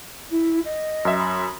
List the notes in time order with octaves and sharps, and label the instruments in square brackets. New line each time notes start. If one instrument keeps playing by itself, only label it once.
[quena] E4
D#5
[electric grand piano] F#2 E5
[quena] B5